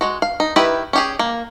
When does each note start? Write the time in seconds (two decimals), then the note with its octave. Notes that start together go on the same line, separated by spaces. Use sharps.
0.01 G#3 F#4
0.22 F5
0.40 D#4
0.56 D#3 E4 G4 B4
0.93 C#4 G4 G#4
1.19 A#3